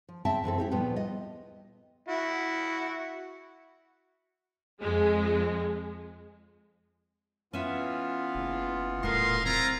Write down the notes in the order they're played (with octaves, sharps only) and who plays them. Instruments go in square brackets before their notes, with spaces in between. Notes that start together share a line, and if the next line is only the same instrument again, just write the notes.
[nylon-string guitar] F3
C#3 C4 E5 G5 A5
F#2 E3 C4 A4
E4 G4 A4
D2 A#2 F3 G3 B3 G5
D#5
[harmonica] E4 F#4
[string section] F2 G#3
[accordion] E3 B3 F4 [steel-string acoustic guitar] C#4 E5
[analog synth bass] F#1
[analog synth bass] D#1 [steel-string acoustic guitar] A2 A#4 [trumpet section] D#5 F5 C6
[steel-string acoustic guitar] C4 [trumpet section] E4 F4 A#5